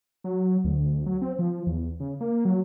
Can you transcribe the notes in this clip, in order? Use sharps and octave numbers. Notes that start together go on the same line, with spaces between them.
F#3
D2
F#3
C4
F3
E2
C#3
A#3
F#3